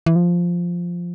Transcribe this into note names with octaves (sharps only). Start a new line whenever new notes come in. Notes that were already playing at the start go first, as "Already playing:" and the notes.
E3
F3